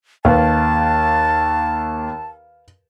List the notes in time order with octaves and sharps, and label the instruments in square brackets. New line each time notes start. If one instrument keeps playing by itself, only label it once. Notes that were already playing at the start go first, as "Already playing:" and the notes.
[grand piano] D#2 [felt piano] B4 F5 [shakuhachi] A5